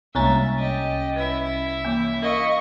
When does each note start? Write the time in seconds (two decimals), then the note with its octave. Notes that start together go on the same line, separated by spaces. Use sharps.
0.15 C2 G#3 A#3 C#4 E5 A#5 A6
0.56 G4 D#5
1.16 E4 B4 E5
1.85 E3 A#3
2.22 A#4 D#5 F5 C#6